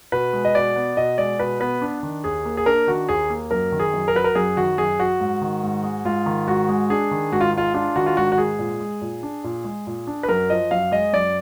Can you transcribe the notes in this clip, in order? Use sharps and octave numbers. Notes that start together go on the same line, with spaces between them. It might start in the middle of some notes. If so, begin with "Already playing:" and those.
B2 B4
G#3
D#5
B2 D5
B3
B2 D#5
G#3 D5
B2 B4
B3 B4
D4
D#3
D#2 G#4
A#3
G#4
D4 A#4
D#3 F#4
D#2 G#4
A#3
F#2 A#4
D#3
G#4
F#2
A#4
F#3 B4
A#4
F#2 G#4
D#3 F#4
F#2 G#4
F#3 F#4
G#2
D#3
G#2
G#3
G#2 F4
D#3
G#2 F#4
G#3
D4 G#4
D#3
G#2 F#4
F4
G#3 F4
D4 F4
D#3 F#4
F4
G#2 F#4
F#4
G#3 G#4
A#2
G#3
A#2
D4
A#2
G#3
A#2
D4
B4
F#2 A#4
F3 D#5
F#2 F5
G#3 D#5
F#2 D5